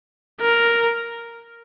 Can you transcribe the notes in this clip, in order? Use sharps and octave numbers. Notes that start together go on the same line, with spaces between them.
A#4